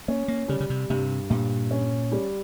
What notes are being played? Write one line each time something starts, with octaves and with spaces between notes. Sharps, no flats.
A#3 C#4
A#3
C#3 G3
C#3
C3
G2 C3
G2 A#2
C#4
G3